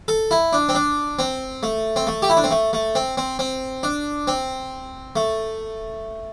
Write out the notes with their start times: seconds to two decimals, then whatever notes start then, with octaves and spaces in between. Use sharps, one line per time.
0.08 A4
0.31 E4
0.53 D4
0.69 C4
0.75 D4
1.19 C4
1.63 A3
1.96 C4
2.07 A3
2.22 G4
2.30 E4
2.37 D4
2.44 C4
2.51 A3
2.73 A3
2.95 C4
3.17 C4
3.39 C4
3.83 D4
4.27 C4
5.16 A3